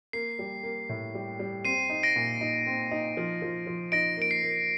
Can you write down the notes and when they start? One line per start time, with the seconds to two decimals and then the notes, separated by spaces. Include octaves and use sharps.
0.13 A#3 C7
0.39 G3
0.64 A#3
0.89 A2
1.15 G3
1.39 G3
1.64 C4 C7 D#7
1.90 D#4
2.03 A#6 D7
2.16 A#2
2.41 D#4
2.66 C4
2.91 D#4
3.17 F3
3.42 F3
3.67 F3
3.92 D#4 A#6 D7
4.17 A#3 D7
4.31 C7
4.42 A#3